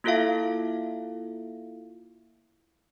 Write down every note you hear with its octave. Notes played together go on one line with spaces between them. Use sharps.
A#3 E4 F4 A4 E5 F5